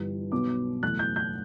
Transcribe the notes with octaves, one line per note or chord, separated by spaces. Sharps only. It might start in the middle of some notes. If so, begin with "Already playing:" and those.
Already playing: G1 G2 E3 G3
B1 B2 F#3 B3 D6
F#1 E2 B2 A3 F#6
G6
G6